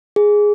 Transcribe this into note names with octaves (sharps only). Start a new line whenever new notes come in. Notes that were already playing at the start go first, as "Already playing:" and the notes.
G#4